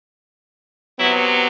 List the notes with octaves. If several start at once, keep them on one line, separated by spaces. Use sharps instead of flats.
C3 F#3 B3 E4